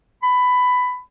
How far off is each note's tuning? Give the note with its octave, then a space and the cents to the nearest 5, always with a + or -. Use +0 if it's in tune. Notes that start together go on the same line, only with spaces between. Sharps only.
B5 +15